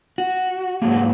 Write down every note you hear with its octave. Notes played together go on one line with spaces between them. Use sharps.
F#4
G#2 F#3 A#3 G#4
F#4